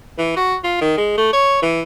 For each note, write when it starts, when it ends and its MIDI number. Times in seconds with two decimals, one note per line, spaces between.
0.19 0.32 52
0.37 0.55 66
0.64 0.77 65
0.81 0.94 51
0.97 1.14 56
1.18 1.31 57
1.33 1.60 73
1.62 1.82 52